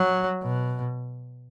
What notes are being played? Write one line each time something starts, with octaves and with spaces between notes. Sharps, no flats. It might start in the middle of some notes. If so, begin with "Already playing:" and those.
Already playing: F#3
B2